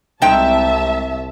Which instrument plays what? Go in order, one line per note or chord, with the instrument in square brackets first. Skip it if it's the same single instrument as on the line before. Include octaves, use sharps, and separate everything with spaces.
[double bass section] C2 [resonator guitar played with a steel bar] G#3 D#4 G5 [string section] E5 A5